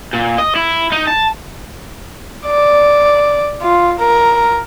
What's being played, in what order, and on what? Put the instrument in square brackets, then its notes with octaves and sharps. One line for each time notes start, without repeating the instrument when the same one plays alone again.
[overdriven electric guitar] A#2
D#5
E4
D#4
A5
[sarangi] D5
F4
A#4